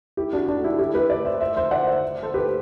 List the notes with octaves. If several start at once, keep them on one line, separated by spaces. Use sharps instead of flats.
E4 G4
D4 F#4
D4 F#4
A4
E4 G4
E4 G4
G4 B4
B4 D5
C5 E5
C5 E5
C5 E5
D5 F#5
C5 E5
A4 C5
G4 B4